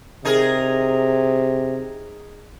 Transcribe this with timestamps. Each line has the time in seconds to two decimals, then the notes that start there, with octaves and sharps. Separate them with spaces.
0.25 C3 D#4 G#4 A#4